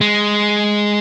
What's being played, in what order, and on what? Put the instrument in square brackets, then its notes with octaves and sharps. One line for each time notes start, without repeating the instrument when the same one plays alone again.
[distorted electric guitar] G#3